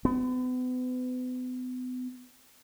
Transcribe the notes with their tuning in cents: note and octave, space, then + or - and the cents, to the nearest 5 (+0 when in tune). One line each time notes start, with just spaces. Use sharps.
B3 +40